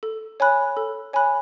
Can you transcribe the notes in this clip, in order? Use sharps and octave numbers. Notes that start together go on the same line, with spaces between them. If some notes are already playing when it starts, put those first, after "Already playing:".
A4
C#5 G#5 B5 F#6
A4
C#5 G#5 B5 F#6